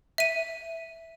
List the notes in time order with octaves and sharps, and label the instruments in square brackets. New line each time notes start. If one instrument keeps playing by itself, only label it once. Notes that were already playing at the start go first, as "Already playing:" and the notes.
[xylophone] E5 D#7